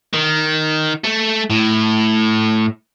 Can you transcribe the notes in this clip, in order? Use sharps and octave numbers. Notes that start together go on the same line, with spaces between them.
D#3
A3
A2